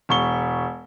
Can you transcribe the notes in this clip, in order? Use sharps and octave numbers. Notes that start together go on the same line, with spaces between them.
E1 C#6 G7